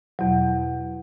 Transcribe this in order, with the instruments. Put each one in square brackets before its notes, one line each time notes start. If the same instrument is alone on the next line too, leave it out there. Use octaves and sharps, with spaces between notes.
[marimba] E2 B2 F#3